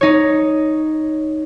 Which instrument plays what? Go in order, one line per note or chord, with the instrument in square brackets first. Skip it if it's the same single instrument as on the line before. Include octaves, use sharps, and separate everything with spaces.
[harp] D#4 C#5